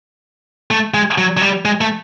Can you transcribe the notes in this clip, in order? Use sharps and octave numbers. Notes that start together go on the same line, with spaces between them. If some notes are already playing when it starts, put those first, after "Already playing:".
A3
G#3
F#3
F#3
G3
G#3
A3